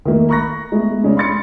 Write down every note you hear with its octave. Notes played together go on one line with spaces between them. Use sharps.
D#3 A3 A#3
A#5 B5 C#6 F#6 A#6
G#3 A3 B3
C#3 G#3 C#4 D4
B5 C6 A6 C#7